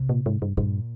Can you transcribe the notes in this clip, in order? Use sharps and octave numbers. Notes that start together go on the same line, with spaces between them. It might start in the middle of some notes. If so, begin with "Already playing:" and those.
Already playing: C3
A#2
G#2
G2
G2 A#2